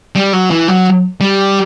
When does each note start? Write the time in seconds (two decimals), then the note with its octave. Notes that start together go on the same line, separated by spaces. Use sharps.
0.16 G3
0.33 F#3
0.51 E3
0.68 F#3
1.21 G3